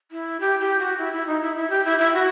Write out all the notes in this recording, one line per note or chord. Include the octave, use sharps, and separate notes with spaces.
E4
G4
G4
F#4
E4
E4
D#4
E4
E4
G4
E4
E4
F#4